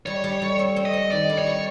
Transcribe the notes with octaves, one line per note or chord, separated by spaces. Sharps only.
G3 C#5
G3
G3
C4
C4
D#5
C4
D#3 D5
G3
C#5
G3